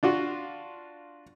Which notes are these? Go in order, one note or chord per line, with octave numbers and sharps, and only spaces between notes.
D4 F4 F#4